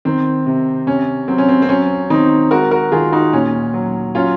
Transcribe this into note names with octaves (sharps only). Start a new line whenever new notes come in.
D#3 C4
C3
C3 C#4
F#3 C4
C#4
C4
C4
F#3 C#4
D#3 C4 D#4
G#3 F#4 A#4
F#4 A#4
D#3 F4 G#4
D#4 F#4
A#2 C#4
F#3
F#3 C#4 F4